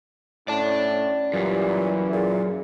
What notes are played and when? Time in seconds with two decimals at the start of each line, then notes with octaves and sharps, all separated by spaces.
0.48 A2 C#4 D5 A5
1.34 F#2 A#2 E3 G3
2.13 A#2 G#4